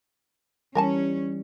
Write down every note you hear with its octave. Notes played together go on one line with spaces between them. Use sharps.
E3 G3 C#4 A#4 G#5 A5